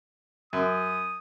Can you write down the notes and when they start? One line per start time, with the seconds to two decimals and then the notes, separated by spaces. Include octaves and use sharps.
0.53 F#2 D#6